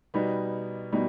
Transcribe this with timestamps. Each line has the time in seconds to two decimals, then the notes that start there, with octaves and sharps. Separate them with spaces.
0.14 B2 G3 B3 D#4
0.92 B2 G3 B3 D#4